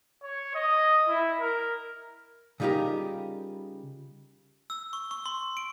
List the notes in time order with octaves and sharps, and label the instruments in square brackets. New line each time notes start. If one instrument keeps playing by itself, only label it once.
[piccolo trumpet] C#5
D#5
E4
A#4
[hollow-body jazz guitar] C#3 G3 D#4 F4 G4 A#4
[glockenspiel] E6
C#6
C#6
C6
D7